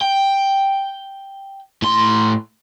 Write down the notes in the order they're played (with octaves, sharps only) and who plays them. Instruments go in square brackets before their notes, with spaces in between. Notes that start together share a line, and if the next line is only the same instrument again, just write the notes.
[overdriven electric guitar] G5
A2 C6